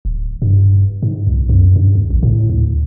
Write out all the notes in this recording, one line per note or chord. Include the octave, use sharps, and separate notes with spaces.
D1
G2
G#2
C2
F#2
G2
D#2
A1
A2
D2